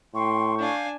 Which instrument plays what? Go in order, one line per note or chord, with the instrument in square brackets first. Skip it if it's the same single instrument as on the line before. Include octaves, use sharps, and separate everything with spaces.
[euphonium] A2 [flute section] G5 C6 [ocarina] C#6
[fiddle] D4 G#5 [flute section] F5 G6